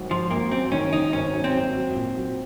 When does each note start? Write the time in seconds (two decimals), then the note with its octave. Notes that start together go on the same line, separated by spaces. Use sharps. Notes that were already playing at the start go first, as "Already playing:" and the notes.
Already playing: G#1 F#2 F#3
0.10 G#1 F3
0.31 G#1 A#3
0.51 F#2 C4
0.72 D#3 C#4
0.92 D#3 D#4
1.13 G#1 C#4
1.33 F#2
1.44 C4
1.55 F#2
1.75 F#3
1.95 A#2
2.16 F#3